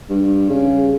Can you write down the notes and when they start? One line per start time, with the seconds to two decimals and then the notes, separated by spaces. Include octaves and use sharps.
0.09 G2
0.50 C#3